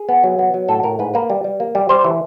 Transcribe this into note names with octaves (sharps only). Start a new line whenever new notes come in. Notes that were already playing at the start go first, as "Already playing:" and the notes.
Already playing: G#4
B3
F#3
B3
F#3
A2 A4
A2 A#4
G#2 B4
A#3 B4
G3
G3
A#3
G3
G3 C5
E3